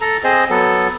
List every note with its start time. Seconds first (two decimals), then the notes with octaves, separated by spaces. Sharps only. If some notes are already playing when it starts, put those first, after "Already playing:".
0.01 A4 A#5
0.24 C4 G#4 C5 D#5
0.50 F#3 B3 A4